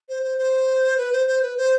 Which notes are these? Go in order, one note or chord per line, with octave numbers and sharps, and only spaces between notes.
C5
C5
C5
B4
C5
C5
B4
C5